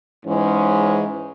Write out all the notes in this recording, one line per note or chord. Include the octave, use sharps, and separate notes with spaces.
G#2 E3 G#3 C#4